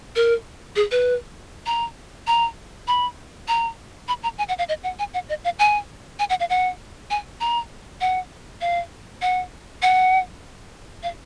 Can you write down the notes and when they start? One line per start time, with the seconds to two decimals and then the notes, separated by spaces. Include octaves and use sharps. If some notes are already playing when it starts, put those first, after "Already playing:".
0.16 A#4
0.76 G#4
0.91 B4
1.66 A#5
2.27 A#5
2.88 B5
3.48 A#5
4.08 B5
4.23 A#5
4.38 G#5
4.49 F#5
4.59 F5
4.69 D#5
4.83 F#5
4.99 G#5
5.14 F#5
5.29 D#5
5.44 F5
5.59 G#5
6.19 G#5
6.30 F#5
6.40 F5
6.50 F#5
7.11 G#5
7.41 A#5
8.01 F#5
8.61 F5
9.22 F#5
9.82 F#5
11.03 F5